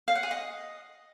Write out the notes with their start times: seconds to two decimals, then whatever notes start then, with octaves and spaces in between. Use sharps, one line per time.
0.08 F5
0.15 F#5
0.23 G#4
0.31 D#5